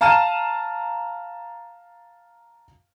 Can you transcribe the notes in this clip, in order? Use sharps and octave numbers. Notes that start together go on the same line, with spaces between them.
F5 A5 A#5 F6 D#7 E7